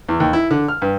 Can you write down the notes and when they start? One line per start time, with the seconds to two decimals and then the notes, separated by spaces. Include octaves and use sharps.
0.09 E2
0.20 D#2
0.33 E4
0.51 D3
0.68 F6
0.82 G2